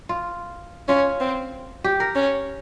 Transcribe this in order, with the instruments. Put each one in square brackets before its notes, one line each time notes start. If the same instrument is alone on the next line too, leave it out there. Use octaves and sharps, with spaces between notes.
[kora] F4
[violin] C#4 [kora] F4
[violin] C4
[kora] G4
A#4
[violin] C#4